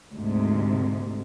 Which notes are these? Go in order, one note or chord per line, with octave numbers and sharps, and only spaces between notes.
D2 G#2 C3